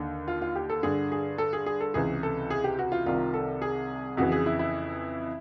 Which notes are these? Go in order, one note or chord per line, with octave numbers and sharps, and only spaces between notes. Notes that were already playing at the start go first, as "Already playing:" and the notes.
Already playing: D#2 D3
F4
F4
G4
A4
G2 D3 G#4
G#4
A4
G#4
G#4
A4
C#2 C3 E3 G#4
A4
G#4
G4
F#4
F4
C2 C3 D#3 F4
A4
G#4
F2 C#3 E3 F#4
G#4
E4
E4